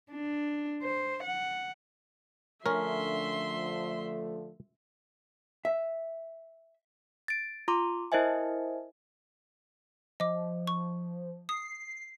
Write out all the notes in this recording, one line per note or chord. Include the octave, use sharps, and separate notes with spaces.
D4
C5
F#5
D3 F3 A3 C#4 A#4 E5 C6
E5
A6 D7
F4 A#5 C6 D6
E4 A#4 C5 D#5 E5 G#5
F3 D#5 D6
C#6
D#6 C7